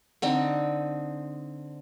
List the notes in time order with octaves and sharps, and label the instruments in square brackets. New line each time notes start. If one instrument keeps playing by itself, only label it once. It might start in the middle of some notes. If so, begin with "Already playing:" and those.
[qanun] D3 C4 D#4